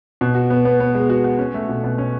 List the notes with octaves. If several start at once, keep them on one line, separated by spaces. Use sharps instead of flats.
B2
F#4
B3
B3
B3
G#3
F#4
F#4
C#4
A3
B2
B2
C#4